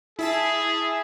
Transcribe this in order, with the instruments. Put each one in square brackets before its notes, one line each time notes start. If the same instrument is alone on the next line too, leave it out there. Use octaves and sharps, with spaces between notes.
[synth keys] E4 E5 A5 [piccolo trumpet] G#4